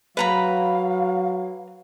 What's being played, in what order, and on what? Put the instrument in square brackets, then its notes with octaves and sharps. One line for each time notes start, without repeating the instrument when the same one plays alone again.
[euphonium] F#3 [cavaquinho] B4 A#5 B5 [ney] F5